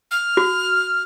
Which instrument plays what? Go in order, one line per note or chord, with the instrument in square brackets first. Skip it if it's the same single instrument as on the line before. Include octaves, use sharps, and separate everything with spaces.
[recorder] F6
[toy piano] F#4